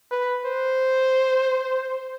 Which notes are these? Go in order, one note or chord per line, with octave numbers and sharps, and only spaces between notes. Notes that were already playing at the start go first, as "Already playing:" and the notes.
B4
C5